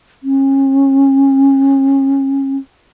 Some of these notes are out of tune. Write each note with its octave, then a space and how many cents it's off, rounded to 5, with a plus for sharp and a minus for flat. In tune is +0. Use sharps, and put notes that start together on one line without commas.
C#4 -30